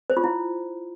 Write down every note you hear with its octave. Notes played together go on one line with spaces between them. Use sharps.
C5
F4
E4